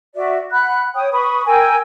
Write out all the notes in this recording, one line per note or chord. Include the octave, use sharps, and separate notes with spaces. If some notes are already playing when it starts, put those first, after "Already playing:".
F#4 D5 E5
F#5 B5 F#6
C#5 G5 D#6
B4 B5 C#6 D#6
A#4 G5 G#5 E6